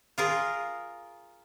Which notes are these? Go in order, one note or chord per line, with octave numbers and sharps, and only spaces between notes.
F4 G#4 A#4